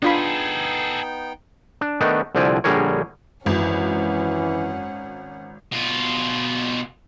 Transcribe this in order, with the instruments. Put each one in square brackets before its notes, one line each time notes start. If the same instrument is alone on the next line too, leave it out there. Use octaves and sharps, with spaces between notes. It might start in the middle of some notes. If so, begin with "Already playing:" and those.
[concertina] B3 D#4 G5 [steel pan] D4 F4 B5 [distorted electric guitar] G#4 A4
[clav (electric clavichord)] D4
D#3 A3 B3 D4 D#4
C2 D3 F3 C4 D5 G#5
A#1 D3 G3 G#4 A#4 C#5
[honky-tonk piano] G#1 [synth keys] F#2 [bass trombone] E3 [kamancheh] C#4 F#5
[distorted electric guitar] B2 F4